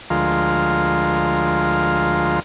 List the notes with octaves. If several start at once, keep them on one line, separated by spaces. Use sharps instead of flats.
D2 F3 G#3 F4 A#4